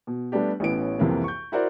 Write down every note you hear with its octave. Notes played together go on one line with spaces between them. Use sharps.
B2
G3 A3 B3 D4 G4
A1 A2 E3 B3 C#4 D7
C2 F2 C3 E3 A#3
C#6 G6
E4 F#4 A#4 C5 D5